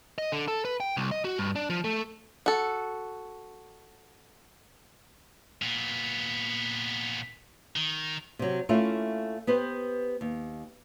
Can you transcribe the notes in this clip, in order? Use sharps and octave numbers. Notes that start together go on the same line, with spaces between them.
D#5
D3
A4
B4
G5
C2
D#5
F#4
G2
D4
F3
A3
F#4 A4
A#2 B3
D#3
C3 F#3
A3 A#3 C#4 E4 F4
B3 G4 B4 C5
D#2